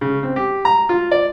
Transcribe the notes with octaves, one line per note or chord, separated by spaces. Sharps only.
C#3
C4
G4
A#5
F4
D5